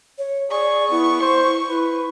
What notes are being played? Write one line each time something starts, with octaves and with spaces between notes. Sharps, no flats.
C#5
G#4 D5 C#6
B3 E4
C5
E4 B4